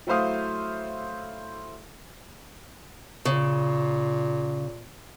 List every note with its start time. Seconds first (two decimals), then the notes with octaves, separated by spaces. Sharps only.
0.07 F#3 A3 E4 C5 F5 D#6
3.25 A#2 C#3